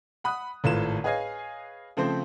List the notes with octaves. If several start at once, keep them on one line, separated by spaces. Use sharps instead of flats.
F#5 B5 D#6 F#6
G#1 A2 F4 A4 B4 E7
G#4 B4 C#5 D#5 F5 G#5
C#3 F3 A3 C4 C5